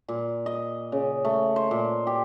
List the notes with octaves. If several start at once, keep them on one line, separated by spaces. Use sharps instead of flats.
A#2
D#5
C#3
A3
C5
A#2
G4